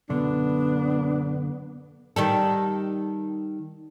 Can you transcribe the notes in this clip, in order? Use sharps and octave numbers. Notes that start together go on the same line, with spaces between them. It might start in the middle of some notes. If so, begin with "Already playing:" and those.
F#2 B2 D3 B3 D4
D#3 G3 A4